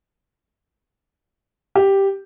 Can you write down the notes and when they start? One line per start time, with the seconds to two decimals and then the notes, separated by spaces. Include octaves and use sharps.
1.75 G4